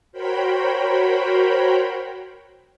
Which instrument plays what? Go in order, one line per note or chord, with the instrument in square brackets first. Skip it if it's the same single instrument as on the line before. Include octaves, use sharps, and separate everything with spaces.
[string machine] F#4 A#4 C5 C#5 G5 B5